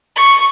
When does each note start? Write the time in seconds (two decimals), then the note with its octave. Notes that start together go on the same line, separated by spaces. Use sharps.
0.16 C#6